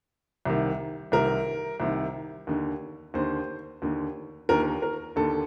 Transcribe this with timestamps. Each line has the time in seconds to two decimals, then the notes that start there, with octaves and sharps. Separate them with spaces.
0.46 C2 C3 D#3
1.12 C2 C3 D#3 A#4
1.80 C2 C3 D#3
2.47 D#2 D3
3.14 D#2 D3 C5
3.82 D#2 D3
4.49 D#2 D3 A#4
4.82 A#4
5.16 D#2 D3 A4